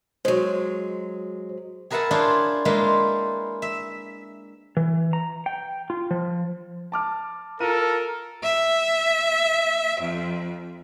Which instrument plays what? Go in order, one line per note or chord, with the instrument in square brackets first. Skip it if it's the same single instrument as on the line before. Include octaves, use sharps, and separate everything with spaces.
[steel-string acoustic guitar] F#3 G#3 [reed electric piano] C5
[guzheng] G#4 A#4 B4 E5 F#5 A5
D4 E4 F4 G#4 C5 C#5
G#3 A#3 E4 F4 B4 C5
E5
[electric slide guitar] E3
A#5
G5
F4
F3
[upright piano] A5 D6 F6
[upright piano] F4 D#7 [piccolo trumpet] A4 [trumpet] A#4
[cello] E5
F2